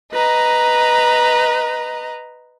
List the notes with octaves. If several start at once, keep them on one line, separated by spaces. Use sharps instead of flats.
B4 D#5 A#5